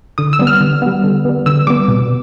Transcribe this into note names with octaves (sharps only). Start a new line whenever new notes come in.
D3 D#6
E6
G3 B3
F6
D3
G3 B3
D3
G3 B3
D3 E6
G3 B3 D6
B2